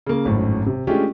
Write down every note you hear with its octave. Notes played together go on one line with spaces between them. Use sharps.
C#3 A#3
G#1 F#2 A2
C3
G#3 A3 C#4 D4 F4 G4